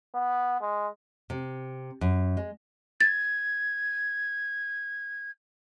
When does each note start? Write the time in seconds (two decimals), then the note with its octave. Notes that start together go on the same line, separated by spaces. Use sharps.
0.15 B3
0.61 G#3
1.30 C3
2.01 F#2
2.37 G#3
3.01 G#6 A6